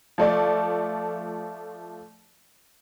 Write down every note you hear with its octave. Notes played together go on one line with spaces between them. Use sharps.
F3 A3 D5